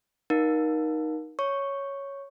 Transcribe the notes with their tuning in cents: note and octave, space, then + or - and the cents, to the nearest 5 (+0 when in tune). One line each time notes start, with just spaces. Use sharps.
D#4 +0 A#4 +25 F5 +35
C#5 +0 C#6 +0